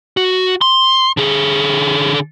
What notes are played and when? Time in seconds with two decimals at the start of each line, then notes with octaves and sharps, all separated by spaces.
0.17 F#4
0.61 C6
1.17 D3 G#4